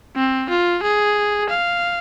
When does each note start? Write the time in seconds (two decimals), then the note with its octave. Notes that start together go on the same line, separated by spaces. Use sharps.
0.16 C4
0.50 F4
0.83 G#4
1.49 F5